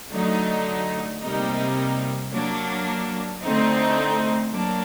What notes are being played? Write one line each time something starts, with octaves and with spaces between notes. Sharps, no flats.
D3 F#3 A3 D#4
C3 G3 A#3 D#4
F#3 A#3 D4
D3 A3 C4 D#4
F#3 A#3 D4